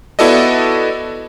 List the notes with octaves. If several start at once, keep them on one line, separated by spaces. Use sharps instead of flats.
B3 E4 F#4 A4 D5 D#5